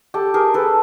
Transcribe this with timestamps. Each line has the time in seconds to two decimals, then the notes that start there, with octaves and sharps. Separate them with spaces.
0.14 G4 A4
0.34 G#4 A#4
0.54 A4 B4